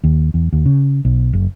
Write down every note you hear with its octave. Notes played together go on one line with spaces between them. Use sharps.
D#2
E2
D#2
C#3
B1
F#1